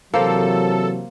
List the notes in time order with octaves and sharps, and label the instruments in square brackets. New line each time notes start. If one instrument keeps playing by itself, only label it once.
[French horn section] C3 E3 F#3 [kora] A#3 C5 [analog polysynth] A4